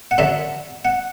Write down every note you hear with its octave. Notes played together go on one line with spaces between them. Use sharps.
F#5
F#2 D3 F#3 E5
F#5